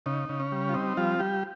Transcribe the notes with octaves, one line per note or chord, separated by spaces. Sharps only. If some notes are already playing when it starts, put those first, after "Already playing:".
C#3 D#4
C#3
C#4
G3
F4
C4 D#4
F3 G3 F4
G3 G4